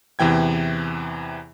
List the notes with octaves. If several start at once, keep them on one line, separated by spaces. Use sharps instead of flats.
E2 C3 E3 G5 G#6